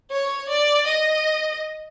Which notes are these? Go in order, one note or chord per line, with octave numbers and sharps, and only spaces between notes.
C#5
D5
D#5